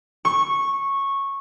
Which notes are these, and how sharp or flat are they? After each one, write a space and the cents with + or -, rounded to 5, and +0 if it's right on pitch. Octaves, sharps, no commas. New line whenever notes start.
C#6 -10